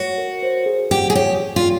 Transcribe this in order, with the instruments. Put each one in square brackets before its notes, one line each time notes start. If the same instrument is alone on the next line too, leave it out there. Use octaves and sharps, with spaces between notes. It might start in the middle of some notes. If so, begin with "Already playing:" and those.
Already playing: [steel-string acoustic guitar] F#4 [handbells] C#5
[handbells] A#4
C5
G#4
[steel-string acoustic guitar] G4 [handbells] F#5
[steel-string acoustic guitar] G#4
[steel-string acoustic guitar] G4 [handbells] C#5
[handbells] C#5
[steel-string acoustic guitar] F4